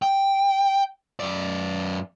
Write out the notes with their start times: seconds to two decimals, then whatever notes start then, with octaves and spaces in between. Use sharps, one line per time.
0.02 G5
1.20 F#2 D5